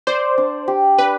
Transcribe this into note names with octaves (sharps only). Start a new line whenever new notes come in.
C5 D5
D4
G4
D4 B4